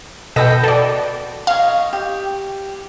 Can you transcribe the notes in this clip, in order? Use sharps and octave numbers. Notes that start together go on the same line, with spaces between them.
B2 A4 B4 D#5 G5 A#6
F#4 A4 D5
C#5 D#5 F5
G4